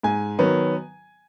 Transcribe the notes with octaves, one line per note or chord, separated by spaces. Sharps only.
G#2 G#5
D#3 F#3 B3